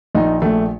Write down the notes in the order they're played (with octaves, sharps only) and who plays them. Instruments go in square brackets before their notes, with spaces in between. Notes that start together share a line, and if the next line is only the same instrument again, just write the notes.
[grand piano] A#1 D#4
A#1 A3